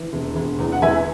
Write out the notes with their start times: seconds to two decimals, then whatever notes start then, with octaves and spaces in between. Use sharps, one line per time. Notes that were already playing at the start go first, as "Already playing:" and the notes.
Already playing: E3
0.13 E1
0.36 E1
0.59 E2
0.72 F#5
0.82 E3 E5 G#5